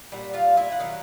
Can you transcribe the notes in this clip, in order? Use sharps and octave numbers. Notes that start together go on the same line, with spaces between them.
A#2 G3 F#5
F4 F5
E4 E5
F#5
D#3 F#3 F5